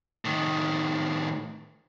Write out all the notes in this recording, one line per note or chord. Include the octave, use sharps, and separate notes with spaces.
A2 D#3